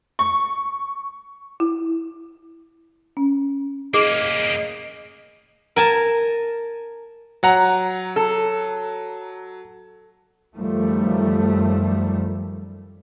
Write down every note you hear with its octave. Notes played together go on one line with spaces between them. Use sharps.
C#6
E4
C#4
A#3 C#4 G#4 D#5
A#4 G#5 A5
F#3 F#5 A#5
A4
F#2 D#3 F3 G3 A3